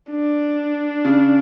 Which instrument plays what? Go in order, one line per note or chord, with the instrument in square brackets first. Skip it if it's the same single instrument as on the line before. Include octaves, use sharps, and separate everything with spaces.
[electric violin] D4
[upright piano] C#3